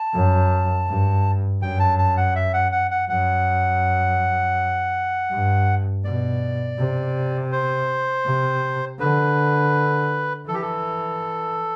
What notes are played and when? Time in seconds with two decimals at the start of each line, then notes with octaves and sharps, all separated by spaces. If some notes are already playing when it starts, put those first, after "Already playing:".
Already playing: A5
0.14 F#2
0.88 G2
1.62 F#2 G5
1.79 A5
1.98 A5
2.17 F#5
2.36 E5
2.53 F#5
2.72 F#5
2.91 F#5
3.09 F#2 F#5
5.31 G2
6.04 B2 D5
6.78 C3
7.52 C5
8.26 C3
8.99 D3 B4
10.47 E3 A4
10.54 G4
10.61 A4